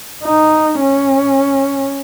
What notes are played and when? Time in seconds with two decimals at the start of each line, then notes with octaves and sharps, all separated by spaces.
0.24 D#4
0.80 C#4